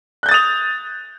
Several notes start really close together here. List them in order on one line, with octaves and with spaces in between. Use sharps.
F#6 G6 A6 D#6 F7